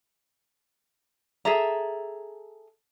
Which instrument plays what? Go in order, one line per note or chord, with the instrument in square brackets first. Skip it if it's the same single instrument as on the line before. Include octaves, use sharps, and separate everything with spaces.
[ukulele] G#4 A4 E5 A#5